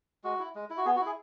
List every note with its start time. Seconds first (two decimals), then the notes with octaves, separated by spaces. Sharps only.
0.24 G#3 F#4
0.39 E4
0.55 G#3
0.70 E4
0.77 F#4
0.86 B3 G#4
0.96 F#4
1.01 E4
1.06 G#4